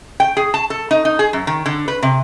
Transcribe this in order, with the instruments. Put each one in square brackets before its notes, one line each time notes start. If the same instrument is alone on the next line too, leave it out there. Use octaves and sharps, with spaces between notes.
[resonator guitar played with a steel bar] G5
G#4
A5
A4
D#4
D#4
G#4
F#2
D#3
D3
B4
C3